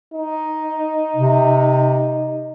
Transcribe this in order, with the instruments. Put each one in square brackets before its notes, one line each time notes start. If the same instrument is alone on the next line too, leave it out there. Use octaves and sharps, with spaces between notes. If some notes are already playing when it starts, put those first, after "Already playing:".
[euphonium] D#4
[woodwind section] C3